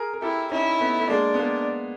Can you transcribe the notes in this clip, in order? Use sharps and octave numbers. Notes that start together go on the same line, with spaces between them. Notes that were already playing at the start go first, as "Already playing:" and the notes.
Already playing: G#4 A#4
A#4
E4 G4 A4
C#4 D#4 E4
A3 B3
A3
G#3 A#3 D4
B3
G#3 A#3